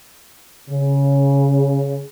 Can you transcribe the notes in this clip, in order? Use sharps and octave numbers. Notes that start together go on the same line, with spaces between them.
C#3